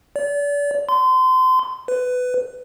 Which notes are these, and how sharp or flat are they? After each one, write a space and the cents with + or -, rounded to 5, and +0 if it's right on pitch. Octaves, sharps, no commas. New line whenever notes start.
D5 -35
C6 -30
B4 +15